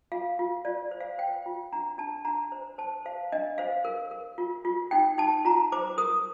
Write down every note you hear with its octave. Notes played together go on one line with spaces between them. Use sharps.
F4 F5
F4
F4 D5
C5
F5
C5 G5
F4
D4 A#5
D4 A5
D4 A#5
C5
C5 A5
C5 F5
D4 D#5
C5 F5
A#4
A#4
F4
F4
D#4 G5
D#4 A5
F4 A#5
C5 D6
A#4 D#6